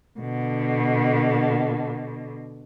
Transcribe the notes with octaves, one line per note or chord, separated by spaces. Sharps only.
B2 D3